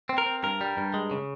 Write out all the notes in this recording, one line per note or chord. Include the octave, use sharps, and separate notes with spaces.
C4
A#4
C4
G2 A#4
G3
G2
G#3
C#3